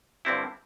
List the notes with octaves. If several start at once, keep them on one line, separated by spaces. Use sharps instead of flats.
G2 D3 G3 C4 E4